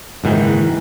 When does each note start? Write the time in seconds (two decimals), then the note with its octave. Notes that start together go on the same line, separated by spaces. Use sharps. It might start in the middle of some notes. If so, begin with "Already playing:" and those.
0.24 F#1 G#2 D#3 E3